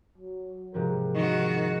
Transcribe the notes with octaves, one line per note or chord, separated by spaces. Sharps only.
F#3
G#2 C3 F3 A#4
G#1 D#3 D#4 F#4 C#6